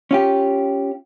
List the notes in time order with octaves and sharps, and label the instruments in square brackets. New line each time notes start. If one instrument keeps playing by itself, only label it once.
[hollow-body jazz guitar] C#4 F4 G4